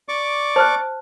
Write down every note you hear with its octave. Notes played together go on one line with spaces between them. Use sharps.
D5 C#6 D6
C5 A5 F6 F#6